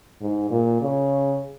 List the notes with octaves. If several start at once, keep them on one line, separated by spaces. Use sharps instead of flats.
G#2
A#2
C#3